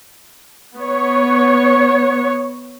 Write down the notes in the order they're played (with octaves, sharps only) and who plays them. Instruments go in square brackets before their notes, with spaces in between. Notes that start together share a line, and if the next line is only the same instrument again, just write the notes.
[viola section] B3 C#5